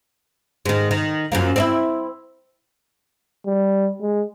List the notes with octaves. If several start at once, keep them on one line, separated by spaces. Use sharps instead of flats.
G#2 D#3
D#3
F#2 F3 A#3
C4 D4 E4
G3
G#3